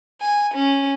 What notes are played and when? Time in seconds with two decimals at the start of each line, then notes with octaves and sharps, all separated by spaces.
0.21 G#5
0.55 C#4